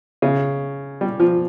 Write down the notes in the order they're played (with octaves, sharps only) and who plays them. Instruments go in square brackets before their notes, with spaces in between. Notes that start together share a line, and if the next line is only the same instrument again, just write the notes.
[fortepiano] C#3
G3
F3